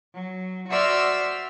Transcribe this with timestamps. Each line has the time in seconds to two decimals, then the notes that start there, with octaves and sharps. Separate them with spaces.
0.13 F#3
0.69 F#4 C5 D5 E5 E6 F6